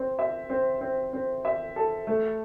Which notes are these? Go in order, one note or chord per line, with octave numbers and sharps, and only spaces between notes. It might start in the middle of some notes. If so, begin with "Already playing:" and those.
Already playing: C4
E5
C4
C4
C4
E5
A4
A3